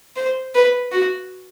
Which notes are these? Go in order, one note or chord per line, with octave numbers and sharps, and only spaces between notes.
C5
B4
F#4